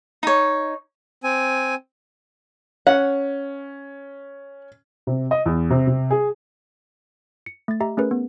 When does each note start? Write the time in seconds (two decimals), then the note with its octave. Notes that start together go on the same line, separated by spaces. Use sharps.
0.23 D#4 C#5
1.24 C4 G#5
2.87 C#4 F#5
5.07 C3
5.31 D#5
5.46 E2
5.70 C3
5.87 C3
6.11 G#4
7.46 C#7
7.68 A3 A6
7.80 G4 D#5 E5 A#5
7.97 A3 C#4 G#4 A#4 B4
8.11 B3